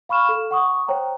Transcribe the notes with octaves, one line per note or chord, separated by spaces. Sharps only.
F5 B5 C#6 F6 E7
A4
F#5 C#6 D#6
C5 C#5 G5 A#5